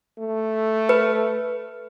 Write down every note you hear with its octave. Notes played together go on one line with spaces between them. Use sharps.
A3
B4